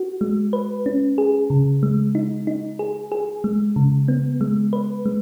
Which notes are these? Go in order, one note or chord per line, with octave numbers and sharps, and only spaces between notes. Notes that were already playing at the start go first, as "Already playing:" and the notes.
Already playing: F#4
G#3
B4
C#4
G#4
C#3
G#3
D#4
D#4
G#4
G#4
G#3
C#3
B3
G#3
B4
G#3